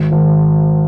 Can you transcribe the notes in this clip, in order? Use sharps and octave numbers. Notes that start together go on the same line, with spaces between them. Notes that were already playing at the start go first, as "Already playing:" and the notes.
Already playing: G#1
G#1